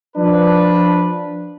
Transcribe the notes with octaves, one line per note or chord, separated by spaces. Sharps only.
F3 D4 B4